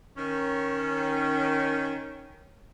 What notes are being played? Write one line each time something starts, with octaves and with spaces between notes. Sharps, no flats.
D#3 C#4